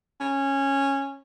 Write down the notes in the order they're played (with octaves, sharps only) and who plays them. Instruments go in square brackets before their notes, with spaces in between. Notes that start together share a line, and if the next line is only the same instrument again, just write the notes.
[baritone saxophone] C#4